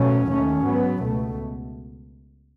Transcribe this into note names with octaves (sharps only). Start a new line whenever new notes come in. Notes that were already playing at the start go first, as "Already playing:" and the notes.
Already playing: B2 F#3 A3 C#4
D#2 D#3 A3 C#4
G#2 F#3 B3
C#2 B2 A3